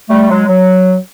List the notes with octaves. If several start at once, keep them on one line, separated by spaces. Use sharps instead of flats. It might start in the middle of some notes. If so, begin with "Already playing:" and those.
G3 A3
F#3 G#3
F#3